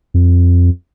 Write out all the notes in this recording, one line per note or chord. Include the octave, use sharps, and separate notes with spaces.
F2